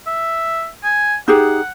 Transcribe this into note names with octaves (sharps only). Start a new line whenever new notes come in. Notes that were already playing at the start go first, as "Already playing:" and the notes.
E5
G#5
D#4 G4 G#4 F#5